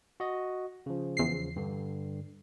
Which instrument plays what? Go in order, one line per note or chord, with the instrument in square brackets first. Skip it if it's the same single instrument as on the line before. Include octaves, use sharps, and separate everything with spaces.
[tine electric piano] F#4 D#5
C#3 F3
[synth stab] E2 C7
[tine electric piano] G2 D3